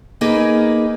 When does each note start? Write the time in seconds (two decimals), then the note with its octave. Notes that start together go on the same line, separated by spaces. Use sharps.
0.21 A#3 D#4 G#4 B4